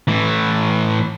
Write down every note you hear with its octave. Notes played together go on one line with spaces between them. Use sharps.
A2 E3